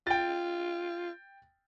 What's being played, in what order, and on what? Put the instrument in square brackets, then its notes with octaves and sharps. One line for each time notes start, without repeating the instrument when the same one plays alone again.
[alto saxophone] F4 [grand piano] G5 A6